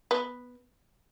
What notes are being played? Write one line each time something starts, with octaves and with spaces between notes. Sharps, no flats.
B3